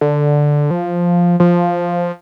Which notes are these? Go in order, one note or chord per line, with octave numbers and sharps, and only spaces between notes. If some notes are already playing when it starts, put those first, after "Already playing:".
D3
F3
F3